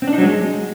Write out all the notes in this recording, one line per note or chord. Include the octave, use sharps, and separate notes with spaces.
C4
D4
D#4
F#3
G#3